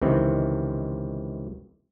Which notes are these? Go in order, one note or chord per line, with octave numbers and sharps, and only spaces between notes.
C#2 C3 D#3 E3 C4